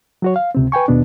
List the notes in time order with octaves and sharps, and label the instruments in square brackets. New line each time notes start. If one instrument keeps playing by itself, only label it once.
[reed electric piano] F#3 F#4 C#5
F5
C#2 C3 C4
B4 G5 G#5 C#6
D#2 B2 B3 D4